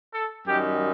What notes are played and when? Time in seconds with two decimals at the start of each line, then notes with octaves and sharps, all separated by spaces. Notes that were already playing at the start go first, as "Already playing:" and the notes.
0.13 A4
0.47 F#2 D#3 G3 D#4 G4